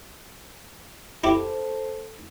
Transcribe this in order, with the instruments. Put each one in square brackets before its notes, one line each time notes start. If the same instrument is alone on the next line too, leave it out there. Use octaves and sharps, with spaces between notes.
[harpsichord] E4 G4 [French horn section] A4 C5